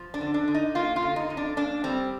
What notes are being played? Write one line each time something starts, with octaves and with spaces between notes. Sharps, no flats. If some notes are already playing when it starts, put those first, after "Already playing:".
Already playing: F3
D4
D3
D4
D3
D#4
A#3 F4
F4
D3
D#4
F2
D4
A#3 D4
G3 C4